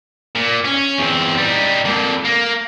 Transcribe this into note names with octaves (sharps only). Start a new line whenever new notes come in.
A#2
C#4
E2 C4
G3 D#4
F2 A#2
A#3